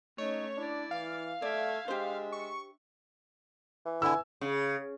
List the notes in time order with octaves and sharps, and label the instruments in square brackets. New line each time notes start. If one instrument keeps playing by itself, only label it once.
[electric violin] A3 C#4 [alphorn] D#4 [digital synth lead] C#5
[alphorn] D4 [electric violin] E4 D5
[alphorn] E3 [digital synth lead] F5
[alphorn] A3 [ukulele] D5 [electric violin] E5 G#6
[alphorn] G#3 [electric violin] D4 E5 [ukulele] G4 C5
[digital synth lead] C#6
[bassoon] E3
[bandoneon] D3 E4 [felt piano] G#5 E6
[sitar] C#3